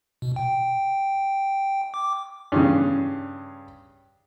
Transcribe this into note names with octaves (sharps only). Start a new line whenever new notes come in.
B2
G5
D6
G2 C#3